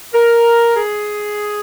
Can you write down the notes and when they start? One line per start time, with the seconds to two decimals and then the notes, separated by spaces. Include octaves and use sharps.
0.14 A#4
0.76 G#4